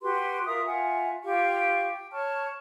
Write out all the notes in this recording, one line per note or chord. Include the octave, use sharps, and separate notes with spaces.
F#4 G4 B4 C6
F4 A#4 E5 D#6
F4 E5 F#5 G#5
F4 G4 F5 C#6
G5
C#5 A5 C#6 F6